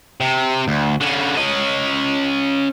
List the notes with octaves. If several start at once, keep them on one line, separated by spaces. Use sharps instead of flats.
C3
D2
D3 C#4
C#4 D#5